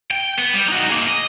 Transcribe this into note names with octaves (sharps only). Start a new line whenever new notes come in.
G5
B3
G3
D#4 F#4
A#3 G#4
D#5